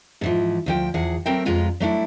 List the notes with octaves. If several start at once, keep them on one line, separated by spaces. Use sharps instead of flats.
G#2 E3 F3
D2 F3 G5
E2 F3 G#4 F#5
F#3 A3 C4 A#4 G5
F2 B2 G#3 F4 A#5
F#3 A3 D4 E4